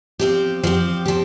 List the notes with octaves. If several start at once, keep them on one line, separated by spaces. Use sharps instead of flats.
F3 C4 G4
F3 C4 G4
F3 C4 G4